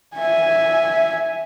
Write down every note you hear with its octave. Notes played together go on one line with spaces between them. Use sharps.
E5 G#5